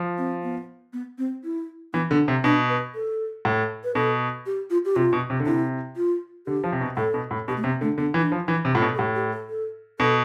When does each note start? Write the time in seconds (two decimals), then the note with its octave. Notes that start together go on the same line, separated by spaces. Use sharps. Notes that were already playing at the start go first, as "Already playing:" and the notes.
Already playing: F3
0.18 C4
0.43 B3
0.93 B3
1.18 C4
1.44 E4
1.93 E3 B3
2.11 D3 B3
2.28 C3 C4
2.44 B2 D4
2.69 B4
2.95 A4
3.45 A2
3.84 B4
3.95 B2 A4
4.46 G4
4.70 F4
4.85 G4
4.96 C3 F4
5.13 B2
5.30 C3
5.40 D3
5.46 C3 E4
5.96 F4
6.47 D3 G4
6.64 F3
6.72 C3
6.81 B2
6.97 A2 A4
7.14 B2
7.31 A2
7.48 B2 G4
7.57 A3
7.64 C3 B3
7.81 D3 A3
7.98 D3 B3
8.14 E3
8.18 E4
8.22 D4
8.32 F3
8.48 E3 E4
8.65 C3
8.74 A2 F4
8.82 B2
8.94 A4
8.98 A2 G4
9.15 G4
9.33 A4
9.49 A4
9.99 B2 A4